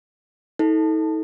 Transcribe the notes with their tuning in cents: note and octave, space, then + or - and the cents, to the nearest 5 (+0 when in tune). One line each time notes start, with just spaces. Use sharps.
D#4 +40 A4 +0